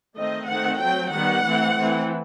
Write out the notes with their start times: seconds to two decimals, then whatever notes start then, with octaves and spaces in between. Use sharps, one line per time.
0.18 D#3 A3 C4 D#5
0.49 D#3 A3 C4 F#5
0.81 F#3 C4 G5
1.12 D#3 G3 B3 F#5
1.44 E3 A3 C4
1.76 E3 A3 C4